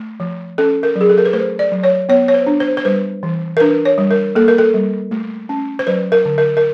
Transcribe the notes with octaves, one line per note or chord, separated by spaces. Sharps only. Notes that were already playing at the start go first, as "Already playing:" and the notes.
Already playing: A3
F3
C#4 A4
A#4
F#3
G#4
A4
A#4
B4
A3 C5
D5
F#3
C#5
B3 C#5
C#5
C5
D4
C5
C5
G3 B4
E3
A#4
D4 B4
C#5
G3
A#4
A#3 A4
A#4
A4
G3
A3
C#4
C5
F#3 B4
A#4
D3
A#4
A#4